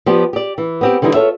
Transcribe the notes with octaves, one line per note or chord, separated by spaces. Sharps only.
F3 B3 G4 D5
G4 D5
E3
B3 C4 G4
D3 E3 G3 C#4 D#4 E4
F4 A4 C#5 E5